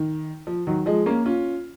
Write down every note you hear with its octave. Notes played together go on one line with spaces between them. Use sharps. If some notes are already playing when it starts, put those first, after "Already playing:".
Already playing: D#3
F3
D#3 F#3
F3 G#3
A#3 C#4
C#4 F4